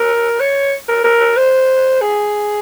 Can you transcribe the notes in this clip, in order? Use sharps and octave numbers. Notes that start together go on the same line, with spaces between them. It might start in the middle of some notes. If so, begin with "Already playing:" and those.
Already playing: A#4
C#5
A#4
A#4
C5
G#4